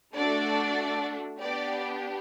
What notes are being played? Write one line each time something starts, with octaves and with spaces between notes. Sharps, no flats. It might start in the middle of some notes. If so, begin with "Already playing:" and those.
A3 D4 F#4 A4 D5
B3 D4 G4 D5